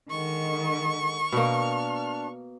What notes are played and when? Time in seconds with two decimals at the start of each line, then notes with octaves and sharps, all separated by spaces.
0.10 D3 D#3 G#3 C#6
1.32 B2 A#3 D4 F6